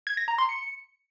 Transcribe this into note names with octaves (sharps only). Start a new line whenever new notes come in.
G#6
A#6
A#5
C6
C#7